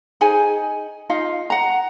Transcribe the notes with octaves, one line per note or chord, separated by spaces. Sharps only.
D#4 G#4 C5 G#5
D#4 F4 D#5 F5
F#5 A#5